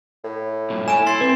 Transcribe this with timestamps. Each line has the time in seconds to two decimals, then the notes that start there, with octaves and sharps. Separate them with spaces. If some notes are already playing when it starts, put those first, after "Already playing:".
0.24 A2
0.70 G2 A#2
0.88 A4 C#5 G#5 D7 E7
1.07 E4 C6 A6 C7
1.21 C4 B4